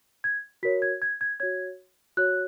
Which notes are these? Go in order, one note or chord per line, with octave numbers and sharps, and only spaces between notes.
G#6
F#4 A#4 C#5 B6
G#6
G#6
G#6
F#4 C#5 G#6
F#4 C#5 F#6